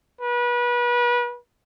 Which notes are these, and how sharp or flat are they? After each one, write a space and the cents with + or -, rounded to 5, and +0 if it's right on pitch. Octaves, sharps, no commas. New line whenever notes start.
B4 -30